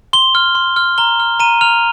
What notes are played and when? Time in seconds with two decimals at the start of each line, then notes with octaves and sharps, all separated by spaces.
0.13 C6 G7
0.35 F6
0.55 C6
0.76 F6
0.98 A#5 G7
1.20 F6
1.40 A#5 D#7
1.61 F6 F7